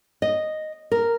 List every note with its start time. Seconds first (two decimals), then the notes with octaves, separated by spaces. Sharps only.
0.22 D#5
0.91 A#4